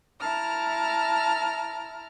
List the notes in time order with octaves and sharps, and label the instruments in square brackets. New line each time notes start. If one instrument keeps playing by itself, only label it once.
[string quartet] E4 A5 A#5 F6